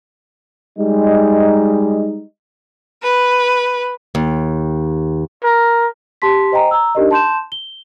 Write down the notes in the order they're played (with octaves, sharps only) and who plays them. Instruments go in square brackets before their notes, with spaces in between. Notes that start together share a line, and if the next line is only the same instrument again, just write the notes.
[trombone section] G3 G#3 D#4
[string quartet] B4
[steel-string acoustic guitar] D#2
[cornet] A#4
[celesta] G4 A5 C6 B6
C5 D#5 G5 G#5 A#5
A#5 E6
D4 D#4 G4 A#4 D5 D#5
A5 C6 G6 E7
G7